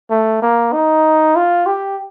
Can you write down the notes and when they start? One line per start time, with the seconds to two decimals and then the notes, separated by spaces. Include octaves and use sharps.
0.10 A3
0.42 A#3
0.73 D#4
1.36 F4
1.66 G4